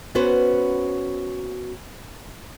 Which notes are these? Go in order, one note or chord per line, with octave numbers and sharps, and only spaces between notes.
B3 C#4 F#4 B4 C5